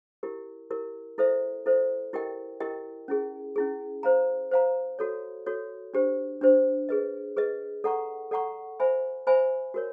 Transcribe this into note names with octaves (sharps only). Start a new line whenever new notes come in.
E4 G4 A#4
E4 G4 A#4
E4 A4 C5 E5
E4 A4 C5 E5
E4 G4 A#4 D#5 G5
E4 G4 A#4 D#5 G5
C#4 E4 G#4
C#4 E4 G#4
C5 F5 A#5
C5 F5 A#5
F#4 A4 C#5
F#4 A4 C#5
D4 G4 C5
D4 G4 C5
G#4 B4 D#5
G#4 B4 D#5
A4 D5 F#5 A#5 C#6
A4 D5 F#5 A#5 C#6
C5 E5 G#5 B5
C5 E5 G#5 B5
F#4 A#4 C#5